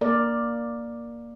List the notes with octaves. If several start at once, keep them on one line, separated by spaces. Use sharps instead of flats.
A#3 A#4 D5